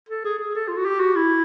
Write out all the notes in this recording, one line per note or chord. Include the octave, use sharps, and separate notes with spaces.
A4
G#4
G#4
A4
F4
F#4
G4
F#4
E4